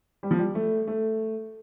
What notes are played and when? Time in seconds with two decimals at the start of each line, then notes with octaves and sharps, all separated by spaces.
0.23 G3
0.31 F3
0.39 G3
0.55 A3
0.87 A3